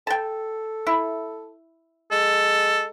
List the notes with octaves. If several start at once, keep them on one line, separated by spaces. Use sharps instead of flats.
A4 G5 A5
E4
G#3 A4